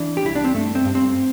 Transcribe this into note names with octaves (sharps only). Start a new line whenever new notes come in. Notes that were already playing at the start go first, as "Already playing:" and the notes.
Already playing: E3 D4
G4
C2 E4
D4
C4
G2 A3
C4
G2
C4